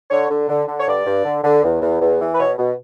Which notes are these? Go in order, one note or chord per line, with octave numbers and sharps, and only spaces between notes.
D3 C#5
D3
D3
D3
C#5
G2 D5
G2
D3
D3
E2
E2
E2
E3
B4
B2 C#5
B2